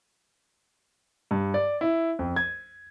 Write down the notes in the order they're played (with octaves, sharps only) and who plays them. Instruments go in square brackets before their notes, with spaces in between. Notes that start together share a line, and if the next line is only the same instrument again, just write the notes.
[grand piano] G2
D5
E4
F2
G#6